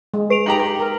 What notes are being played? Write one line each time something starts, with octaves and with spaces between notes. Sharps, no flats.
G#3
B4 D7 F7
D#4 G4 A#5 F#7
G4
A#4